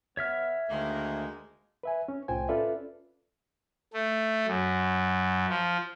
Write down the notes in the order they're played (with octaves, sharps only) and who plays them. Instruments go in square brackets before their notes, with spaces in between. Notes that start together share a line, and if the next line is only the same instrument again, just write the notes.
[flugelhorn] B3 [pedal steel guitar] C#5 E5 F6
[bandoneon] D2 [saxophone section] D#3 A#3 [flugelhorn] G#3
[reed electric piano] B4 E5 G#5
C#4
C2 A2 F4 C5 G5 G#5
C#4 F4 A4 B4 D5 E5
[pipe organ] A3
F#2
F3